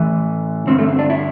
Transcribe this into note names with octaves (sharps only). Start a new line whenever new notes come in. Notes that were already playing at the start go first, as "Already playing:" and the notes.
Already playing: A2 E3
G2 D3 C4
A3
C4
D4
E4